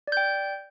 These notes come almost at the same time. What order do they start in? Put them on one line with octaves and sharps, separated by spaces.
D5 G6 G5